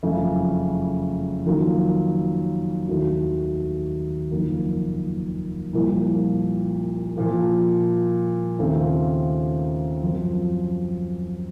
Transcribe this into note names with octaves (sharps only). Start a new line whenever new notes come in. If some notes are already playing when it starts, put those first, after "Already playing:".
F#1 F2 C#3 A3
F2 D#3 F#3 A#3 F4
D#2 D#3 A3 D#4 F#4
F#1 F2 D#3 A#3
C2 A#2 F3 A#3
A#2 F3 A#3
D#2 C#3 A3 C4 F4
F#2 F3 C4